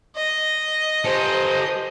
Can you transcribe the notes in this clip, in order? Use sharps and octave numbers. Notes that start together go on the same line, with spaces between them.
D#5
G4 A4 C5